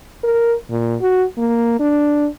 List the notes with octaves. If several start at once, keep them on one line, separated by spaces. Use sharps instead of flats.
A#4
A#2
F#4
A#3
D4